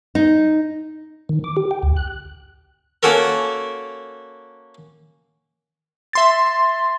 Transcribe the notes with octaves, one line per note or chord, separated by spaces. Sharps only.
D#4
D#3
D6
G4
G5
D2
F#6
A#3 C#4 F#4 A4 A#4
E5 C6 A6